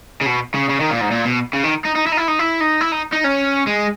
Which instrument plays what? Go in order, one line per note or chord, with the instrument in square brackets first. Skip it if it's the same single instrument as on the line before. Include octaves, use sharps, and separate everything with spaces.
[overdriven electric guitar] C#3
B2
C#3
C#3
D#3
A#2
G#2
A#2
B2
C#3
D#3
D#4
D#4
E4
D#4
E4
D#4
E4
D#4
E4
D#4
D#4
C#4
G#3